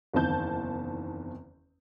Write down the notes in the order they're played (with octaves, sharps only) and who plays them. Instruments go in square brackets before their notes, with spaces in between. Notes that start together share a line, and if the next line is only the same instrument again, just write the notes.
[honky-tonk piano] F#1 E2 D#3 C4 A5 G6